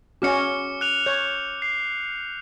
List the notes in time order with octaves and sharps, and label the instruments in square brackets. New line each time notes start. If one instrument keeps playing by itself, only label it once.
[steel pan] C#4 F#4 [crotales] D6 F6 C#7
[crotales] F#6 F7
[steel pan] C#5 [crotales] G6
[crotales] C7